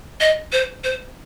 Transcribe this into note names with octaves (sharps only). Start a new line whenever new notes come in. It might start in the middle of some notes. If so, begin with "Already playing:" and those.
D#5
C5
C5